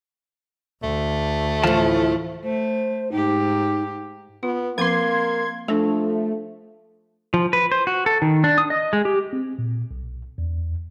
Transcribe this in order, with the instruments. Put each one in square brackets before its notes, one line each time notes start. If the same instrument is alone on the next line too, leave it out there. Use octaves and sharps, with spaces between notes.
[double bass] D2 [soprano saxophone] A3
[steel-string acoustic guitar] A2 F3 [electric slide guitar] E3 F4 A5
[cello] A3 [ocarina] C5
[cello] G#2 G4 [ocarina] D#4
[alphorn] B3 [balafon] F4
[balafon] F3 C4 D6 [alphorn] A#3 [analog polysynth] C6 G#6
[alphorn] F3 [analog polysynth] A3 [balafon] D4 A4
[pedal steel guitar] F3
B4
C5
F#4
A4
D#3
D4
D#6
D#5
G#3
G4
[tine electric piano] C4
A#2
B1
E2